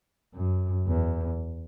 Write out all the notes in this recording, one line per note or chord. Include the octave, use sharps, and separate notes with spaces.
F#2
E2